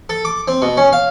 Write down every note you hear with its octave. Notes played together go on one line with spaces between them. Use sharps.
A4
D6
C4
B2
C#4
F5